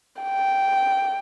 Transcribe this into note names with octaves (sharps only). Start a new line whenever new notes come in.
G5